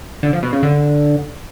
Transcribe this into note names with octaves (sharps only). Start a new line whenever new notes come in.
D3
F3
B2
C#3
D3